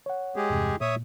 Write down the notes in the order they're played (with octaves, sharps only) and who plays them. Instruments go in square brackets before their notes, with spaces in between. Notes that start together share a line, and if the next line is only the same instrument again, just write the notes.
[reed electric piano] C#5 F#5
[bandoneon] G#3 G4 G#4
[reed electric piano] E2 G2 C3
[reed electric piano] A#2 [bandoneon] C#5 E5 D#6